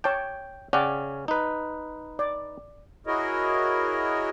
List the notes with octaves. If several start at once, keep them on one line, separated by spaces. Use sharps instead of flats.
C#5 G5 A5 D6
C#3 C#4 D5 F#5 G5
D#4 B4
D5
E4 F#4 G#4 A#4 C#5 D#5